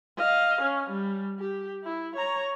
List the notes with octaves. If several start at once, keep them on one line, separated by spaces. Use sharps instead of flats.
D#5 F5
C#4
G3
G4
E4
C#5 A#5